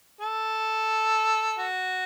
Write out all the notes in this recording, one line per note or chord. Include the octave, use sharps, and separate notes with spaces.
A4
F#4